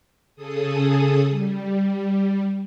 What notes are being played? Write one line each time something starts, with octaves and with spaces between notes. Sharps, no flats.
C#3 G#4 A4 D#6
G3